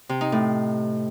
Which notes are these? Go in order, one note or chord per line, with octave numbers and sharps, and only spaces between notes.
C3
D#4
A2